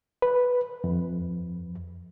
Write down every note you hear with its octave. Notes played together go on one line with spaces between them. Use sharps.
B4
F2